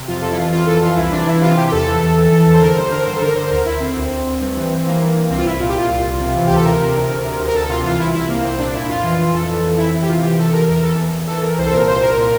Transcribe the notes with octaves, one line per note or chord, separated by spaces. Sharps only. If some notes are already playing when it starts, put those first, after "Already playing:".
Already playing: C3
F2 F4
F2 A4
E4
E3 F4
F2 F4
E3 A4
E3 F4
C2 E4
E3 D4
E3 E4
C3 F4
C3 G4
G4
E2 A4
E3
E2
E3
E3
E2
C5
D3 A#4
G2 C5
D3 A#4
G2 C5
A4
D3 A#4
D3 C5
D2 A#4
D2 E4
D3 C4
D2
D2
D2
G2
E3
E3
E3 A#3
G2
G2
C2 C4
F4
C2 E4
A#2 F4
G4
A#2 F4
C2
C2
C3
E3
D2 G4
A4
C3 A#4
C3
D2
D2
C3
D2
A#4
D2 A4
C3 F4
E3 F4
C2 E4
C2 E4
C2 A#3
C2 C4
A#2 D4
A#2 E4
F2 F4
E3
E3
F2 A4
E3
F2
E3 E4
E3 E4
G4
C3 F4
E3 G4
C3 A4
E3 A#4
E2 A#4
E3 A4
E2
E2
E3 A4
E2 A#4
C2 C5
A4
A#2 A#4
C2 C5
C2 A#4
A#2